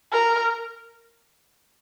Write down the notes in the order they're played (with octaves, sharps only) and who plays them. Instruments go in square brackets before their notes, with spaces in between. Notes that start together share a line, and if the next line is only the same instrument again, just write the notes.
[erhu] A#4